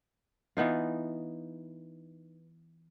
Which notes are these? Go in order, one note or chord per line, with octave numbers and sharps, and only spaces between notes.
E3 B3 D#4 F4